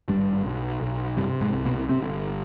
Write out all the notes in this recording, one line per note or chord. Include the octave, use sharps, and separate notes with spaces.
G#1 G2 G3
B1
B1
G2 C3 G3
G#2 G#3
C2
B2 B3
G1 C3 C4